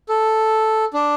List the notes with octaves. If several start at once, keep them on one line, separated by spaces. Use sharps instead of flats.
A4
D4